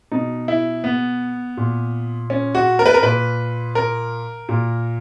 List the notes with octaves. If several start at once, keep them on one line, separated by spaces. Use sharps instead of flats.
B2 D#4
E4
B3
A#2
C#4
F#4
A#4
B4
A#4
A#2 B4
A#4
A#2